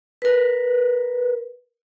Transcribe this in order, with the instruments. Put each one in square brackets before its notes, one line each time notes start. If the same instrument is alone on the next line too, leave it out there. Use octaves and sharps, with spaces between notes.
[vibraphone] A#4 B4